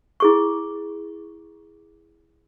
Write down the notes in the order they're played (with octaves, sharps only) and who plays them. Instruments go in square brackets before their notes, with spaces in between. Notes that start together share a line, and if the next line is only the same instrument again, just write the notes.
[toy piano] E4 G#4 C#6